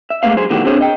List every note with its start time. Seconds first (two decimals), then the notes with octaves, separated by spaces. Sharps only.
0.10 E5
0.23 G#3 A3 B3 C4 F5
0.37 F#3 G#4 C5
0.50 B2 D#3 E3 A3 F#4 G4
0.65 C4 D4 G#4 C5 C#5
0.81 D#5 G5